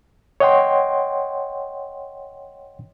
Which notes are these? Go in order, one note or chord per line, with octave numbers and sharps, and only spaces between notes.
C#5 D#5 F#5 G5 C6